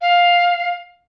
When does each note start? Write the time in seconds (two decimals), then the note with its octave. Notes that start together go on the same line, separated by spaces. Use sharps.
0.01 F5